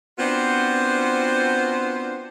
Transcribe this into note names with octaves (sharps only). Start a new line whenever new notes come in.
B3 C4 D4 F4 F#4 C5